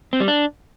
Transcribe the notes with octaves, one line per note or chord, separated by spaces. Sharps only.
C4
G3
D4